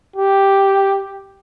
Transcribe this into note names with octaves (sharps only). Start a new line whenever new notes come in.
G4